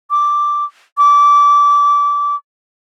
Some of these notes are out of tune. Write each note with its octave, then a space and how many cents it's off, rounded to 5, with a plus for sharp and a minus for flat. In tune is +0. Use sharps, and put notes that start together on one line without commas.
D6 +0
D6 -20